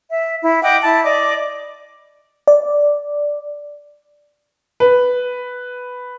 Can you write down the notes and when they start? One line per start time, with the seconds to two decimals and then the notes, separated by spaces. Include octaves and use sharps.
0.08 E5
0.42 E4
0.61 D#5 F#5 G5 D6
0.82 E4 A5
1.03 D5 D#5 D6
2.48 D5
4.80 B4